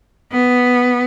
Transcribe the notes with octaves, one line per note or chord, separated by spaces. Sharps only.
B3